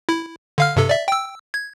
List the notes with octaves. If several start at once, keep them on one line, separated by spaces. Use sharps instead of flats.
E4
D3 F5 F6
G2 C3 A4
D5 E5
G5 E6
G#6